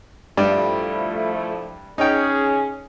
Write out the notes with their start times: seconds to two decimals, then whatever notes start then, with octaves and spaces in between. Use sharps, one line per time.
0.37 G2 F3 G3 A3 E4
1.98 C#4 D#4 G#4 G5